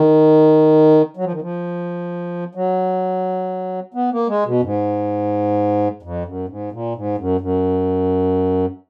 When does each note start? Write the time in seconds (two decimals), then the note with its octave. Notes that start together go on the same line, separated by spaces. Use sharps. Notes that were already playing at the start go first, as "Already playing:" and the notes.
Already playing: D#3
1.17 F#3
1.24 F3
1.32 D#3
1.41 F3
2.55 F#3
3.94 B3
4.12 A#3
4.28 G#3
4.46 B2
4.60 F#2
4.63 G#2
6.03 F2
6.25 F#2
6.49 G#2
6.73 A#2
6.95 G#2
7.18 F#2
7.41 F#2